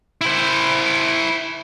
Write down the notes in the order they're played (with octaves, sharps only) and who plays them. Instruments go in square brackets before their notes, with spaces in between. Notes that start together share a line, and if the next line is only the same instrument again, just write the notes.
[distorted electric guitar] E4 C5